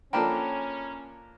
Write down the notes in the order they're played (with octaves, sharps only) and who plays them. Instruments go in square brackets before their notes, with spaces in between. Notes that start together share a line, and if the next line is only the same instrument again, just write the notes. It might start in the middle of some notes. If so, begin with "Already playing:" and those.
[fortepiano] F3 A#3 D4 [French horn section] C#4 [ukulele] A4 G5 [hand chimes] A#5 B5